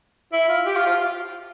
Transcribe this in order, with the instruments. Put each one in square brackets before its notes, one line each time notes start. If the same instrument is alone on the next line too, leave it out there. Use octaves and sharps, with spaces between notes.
[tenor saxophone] E4
F4
G4
F4
F4